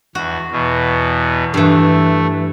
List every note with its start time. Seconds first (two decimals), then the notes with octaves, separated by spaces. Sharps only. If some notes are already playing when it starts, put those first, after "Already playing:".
0.15 E2 F#4
0.51 E2 B2
1.54 G2 E3 A3